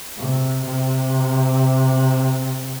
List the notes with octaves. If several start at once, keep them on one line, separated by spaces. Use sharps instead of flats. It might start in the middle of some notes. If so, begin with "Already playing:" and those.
C3
C3